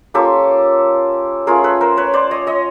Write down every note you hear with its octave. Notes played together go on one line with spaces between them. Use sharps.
A#3 C#4 F4 G4 A4
A3 C#4 F4 G#4 A#4
A4 B4
A#4 C5
B4 C#5
C5 D5
C#5 D#5
C#5 D#5